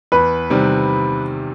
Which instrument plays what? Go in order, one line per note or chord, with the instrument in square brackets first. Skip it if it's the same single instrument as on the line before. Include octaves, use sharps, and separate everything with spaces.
[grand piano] E2 [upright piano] B4
[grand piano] C3 D#3 G3 C4